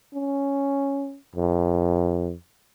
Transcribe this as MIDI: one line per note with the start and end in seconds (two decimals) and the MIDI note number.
0.14 1.17 61
1.35 2.33 41